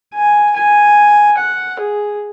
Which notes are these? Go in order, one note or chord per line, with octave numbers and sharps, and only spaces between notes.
G#5
G#5
F#5
G#4